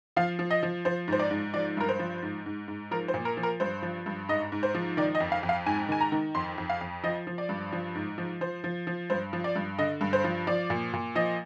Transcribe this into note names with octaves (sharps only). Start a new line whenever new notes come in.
F3 F5
F3
D#5
F3
F3 C5
G#2 C5
D5
G#2
F3 D5
G2 A#4
C5
F3
G#2
G#2
G#2
F3 A#4
C5
A#2
A#4
F3
A#4
G2 C5
F3
G2
G#2 D#5
G#2
C5
F3
D#3 D5
D#5
F2
F5
F2
F5
G#2 G#5
D#3 G#5
A#5
D#3
F2 C6
F2
F5
F2
F3 D#5
F3
D5
G2
F3
G#2
F3
F3 C5
F3
F3
G2 C5
F3
D5
G2
D3 D#5
G2
C5
F3
F3 D5
A#2
A#2
F3 D#5